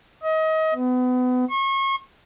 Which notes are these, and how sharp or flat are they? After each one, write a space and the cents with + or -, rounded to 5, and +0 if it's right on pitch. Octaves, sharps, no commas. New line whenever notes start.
D#5 +30
B3 +30
C#6 -35